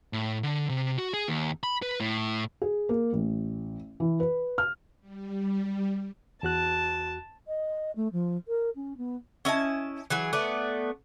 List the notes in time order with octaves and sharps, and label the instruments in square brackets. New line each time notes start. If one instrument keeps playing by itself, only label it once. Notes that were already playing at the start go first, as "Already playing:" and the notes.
[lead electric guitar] A2
D3
C3
F#4
G#4
D#2
B5
B4
A2
[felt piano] G#4
A#3
A1
E3
B4
F6
[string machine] G3
[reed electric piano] E2 F#4 F#6 [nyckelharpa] A5
[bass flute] D#5
A3
F3
A#4
C#4
B3
[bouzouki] C#4 E4 D#5 A5
E3 F#3 G#4
A3 B3 D5